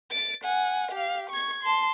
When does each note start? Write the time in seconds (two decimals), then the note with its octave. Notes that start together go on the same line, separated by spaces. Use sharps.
0.11 A6 D7
0.44 F#5 G#5
0.92 G4 F5
1.30 C#6 G#6
1.63 A5 C6